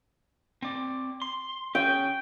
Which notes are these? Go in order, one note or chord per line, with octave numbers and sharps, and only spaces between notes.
C4 D5
C6
C#4 G#4 G5